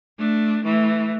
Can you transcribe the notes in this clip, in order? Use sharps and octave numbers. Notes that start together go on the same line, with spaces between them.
A3 D4
E3 A3